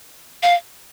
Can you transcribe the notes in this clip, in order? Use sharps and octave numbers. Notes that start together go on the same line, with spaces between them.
F5